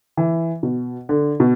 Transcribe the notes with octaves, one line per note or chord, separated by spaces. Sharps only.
E3
B2
D3
B2